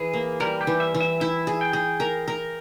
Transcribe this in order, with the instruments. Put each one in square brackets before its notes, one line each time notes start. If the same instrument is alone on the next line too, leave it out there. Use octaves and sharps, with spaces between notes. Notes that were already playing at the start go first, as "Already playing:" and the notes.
Already playing: [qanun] E3 [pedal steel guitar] G#4
[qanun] A#3
[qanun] G3 [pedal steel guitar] A#4
[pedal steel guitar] G4
[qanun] E3
[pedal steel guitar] E5
[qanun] E3
[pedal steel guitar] E5
[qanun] E4 [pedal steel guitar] E5
[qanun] G#4
[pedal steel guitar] G5
[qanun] G#4
A#4
A#4